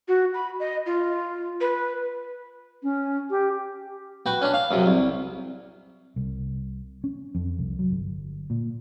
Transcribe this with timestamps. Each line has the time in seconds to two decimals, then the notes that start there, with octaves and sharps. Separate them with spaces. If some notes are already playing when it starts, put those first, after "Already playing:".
0.08 F#4
0.34 B5
0.60 D#5
0.86 F4
1.61 B4
2.83 C#4
3.31 G4
4.26 F#4 B4 G5
4.42 C#4 D4
4.54 F5
4.71 F#2 C3
4.86 C2
6.16 C2
7.04 C#4
7.35 F2
7.59 C2
7.79 F#3
7.90 G1
8.50 A#2